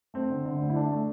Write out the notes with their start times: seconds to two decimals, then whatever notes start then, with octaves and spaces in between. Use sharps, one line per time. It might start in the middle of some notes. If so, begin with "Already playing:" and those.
0.14 A3 C4
0.30 D3
0.46 D3
0.61 D2
0.69 E4
0.75 A3 D4
0.92 A3